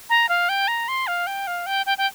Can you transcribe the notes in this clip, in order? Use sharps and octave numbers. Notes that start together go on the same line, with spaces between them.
A#5
F5
G5
A#5
C6
F5
G5
F5
G5
G5
G5